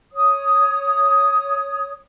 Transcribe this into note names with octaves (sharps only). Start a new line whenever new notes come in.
C#5 D#6